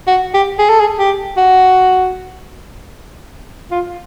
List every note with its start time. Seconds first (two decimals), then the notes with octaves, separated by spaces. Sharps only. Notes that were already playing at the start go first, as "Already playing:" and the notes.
0.07 F#4
0.34 G4
0.59 G#4
0.69 A4
0.80 G#4
0.99 G4
1.37 F#4
3.71 F4